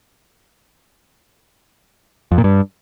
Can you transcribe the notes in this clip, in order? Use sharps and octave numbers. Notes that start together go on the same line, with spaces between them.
F2
A#2
G2